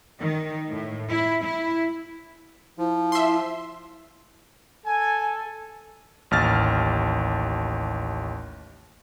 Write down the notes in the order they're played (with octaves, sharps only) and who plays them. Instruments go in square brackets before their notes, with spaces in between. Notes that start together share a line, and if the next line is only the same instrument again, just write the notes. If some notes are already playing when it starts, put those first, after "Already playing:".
[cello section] D#3
A2
E4
E4
[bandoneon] F3 [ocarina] E4
[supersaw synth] E5 C6
[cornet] A4 [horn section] G#5
[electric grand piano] A1 D#2 F6 A6